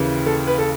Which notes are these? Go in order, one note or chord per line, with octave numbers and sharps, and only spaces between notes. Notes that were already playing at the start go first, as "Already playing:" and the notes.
Already playing: D#2 C#3 E3
A4
B4
A4